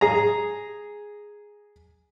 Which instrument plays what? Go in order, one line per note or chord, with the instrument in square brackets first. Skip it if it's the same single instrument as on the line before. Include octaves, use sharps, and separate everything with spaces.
[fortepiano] G#4 A#5